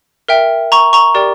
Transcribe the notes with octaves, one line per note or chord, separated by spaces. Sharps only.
A#4 E5 G5
A#5 C#6
A#5 C#6
G4 A#4 D5 G5